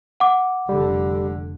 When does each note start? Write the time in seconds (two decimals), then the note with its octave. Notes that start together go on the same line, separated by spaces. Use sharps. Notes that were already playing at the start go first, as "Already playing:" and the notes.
0.20 F#5 D6
0.69 F1 D3 G3